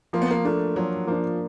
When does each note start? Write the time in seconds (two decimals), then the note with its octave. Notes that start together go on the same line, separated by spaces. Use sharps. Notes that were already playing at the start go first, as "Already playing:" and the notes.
0.13 F3 A#3
0.22 B3
0.31 A#3
0.45 A3 A#3 D4
0.76 F3 F#3
1.07 F3 A#3 D4